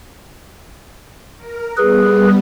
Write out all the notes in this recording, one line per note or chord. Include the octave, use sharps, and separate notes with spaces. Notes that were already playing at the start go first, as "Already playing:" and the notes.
A#4
G3 B3 G#4 B4